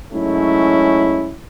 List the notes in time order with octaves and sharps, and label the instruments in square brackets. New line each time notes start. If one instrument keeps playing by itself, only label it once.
[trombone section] G#2 F#3 A3 C#4 E4